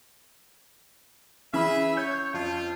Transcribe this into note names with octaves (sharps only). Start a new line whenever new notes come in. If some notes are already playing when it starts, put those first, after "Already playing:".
E3 C#4 G#4 E5 B5
C#5 G6
F2 F4